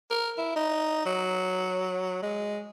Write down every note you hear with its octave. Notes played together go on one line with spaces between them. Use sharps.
A#4
E4
D#4
F#3
G#3